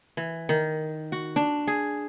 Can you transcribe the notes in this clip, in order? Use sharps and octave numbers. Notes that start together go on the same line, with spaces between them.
E3
D#3
F#4
D4
G#4